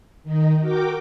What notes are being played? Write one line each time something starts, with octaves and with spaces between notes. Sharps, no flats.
D#3 D#4
F#4 A#4 G5 D6